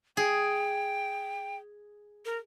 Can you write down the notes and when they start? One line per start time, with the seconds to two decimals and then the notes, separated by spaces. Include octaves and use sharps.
0.17 G#4 G5
2.25 A#4